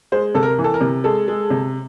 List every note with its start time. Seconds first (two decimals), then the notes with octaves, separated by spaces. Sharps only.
0.12 G#3 C5
0.35 C3 A4
0.43 A#4
0.58 E3
0.64 A4
0.74 A#4
0.81 C3
1.04 G#3 A4
1.28 G#3
1.50 C3